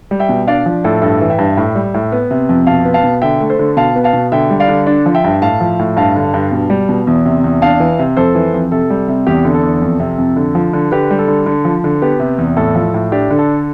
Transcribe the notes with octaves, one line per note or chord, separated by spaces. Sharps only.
G3
E5 G5
B2
D4 D5 F5
F3
A2 A4
G2 A4
E3
E5 G5
G2
A2
G3
A2
B3
C3
F2
B2 F5 A5
B3
F5 A5
B2
D3 E5 G5
A3
A4 C5
D3
B2 F5 A5
B3
F5 A5
B2
D3 E5 G5
G3
D5 F5
D3
D4
F3
E5 G5
G2
A2 F5 A5
F3
A2
G2 F5 A5
D3
G2
B2
G3
B2
E2
C3
E2
D4 F5 A5
E3
C3
F2 A4 C5
E3
F2
C3 A4
G3
C3
E2 G4
D3
A4
E2
F2
C3
F2
D3
F3
D3
D3 G4 B4
G3
A4
D3
D3
F3
D3
B3 G4
C3
E2
A2 A4
F3
A2
D4 G4
D3
A4